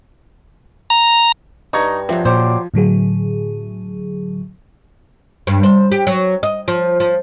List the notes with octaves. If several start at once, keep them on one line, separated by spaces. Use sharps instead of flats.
A#5
G2 D#4 A#5 C#6 G#6
C3 F3 F#3
A#2 F#3 G3 C5 D6
A2 D3 F#3 G#4
G2
C5
G4
F#3
D#5
F3
F3